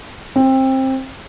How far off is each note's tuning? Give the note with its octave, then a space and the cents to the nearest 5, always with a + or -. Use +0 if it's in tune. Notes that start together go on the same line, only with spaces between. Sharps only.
C4 +20